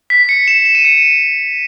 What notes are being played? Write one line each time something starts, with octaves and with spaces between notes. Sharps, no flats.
B6
C#7
E7
E7
D#7
C#7
D#7